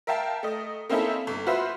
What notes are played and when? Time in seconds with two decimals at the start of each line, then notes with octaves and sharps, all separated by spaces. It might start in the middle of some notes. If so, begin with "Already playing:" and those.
0.07 A#4 E5 F5 G5 A5
0.43 A3 D#5
0.89 A#3 C4 C#4 D#4 E4 A4
1.27 G1
1.46 F4 F#4 B4 C5 E5